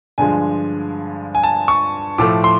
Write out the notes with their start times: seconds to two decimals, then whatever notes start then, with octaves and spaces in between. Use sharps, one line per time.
0.18 G2 D3 F3 G#3 G#5
1.35 G#5
1.44 A5
1.68 C#6
2.18 A2 F3 A3 D6
2.44 C6